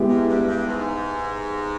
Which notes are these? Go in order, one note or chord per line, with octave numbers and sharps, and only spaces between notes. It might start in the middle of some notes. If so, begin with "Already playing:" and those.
Already playing: G#3 B3 E4 G4
G#2
G2
G2
G#2